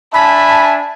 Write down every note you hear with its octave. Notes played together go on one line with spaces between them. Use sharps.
D4 E5 G#5 A5 B5